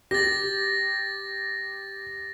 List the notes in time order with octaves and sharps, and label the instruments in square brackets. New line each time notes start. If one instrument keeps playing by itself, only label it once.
[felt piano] G4 [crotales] A6 A#6